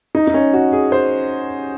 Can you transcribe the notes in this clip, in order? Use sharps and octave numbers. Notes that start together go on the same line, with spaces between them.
D#4
D#4
C#4
F#4
G#4
C5